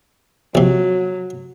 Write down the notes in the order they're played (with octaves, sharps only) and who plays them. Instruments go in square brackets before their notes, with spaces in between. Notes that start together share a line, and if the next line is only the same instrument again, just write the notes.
[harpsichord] A#1 C3 [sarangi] F#3